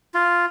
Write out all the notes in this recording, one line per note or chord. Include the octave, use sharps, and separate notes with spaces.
F4